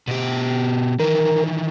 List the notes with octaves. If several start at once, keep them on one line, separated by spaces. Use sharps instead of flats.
B2 G4
D#3 E3 A#4